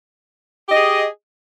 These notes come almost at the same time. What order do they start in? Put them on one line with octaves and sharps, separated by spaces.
G4 D#5 G#4